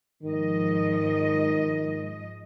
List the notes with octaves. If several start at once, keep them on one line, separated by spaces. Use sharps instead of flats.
G#2 D#3 F3 D#5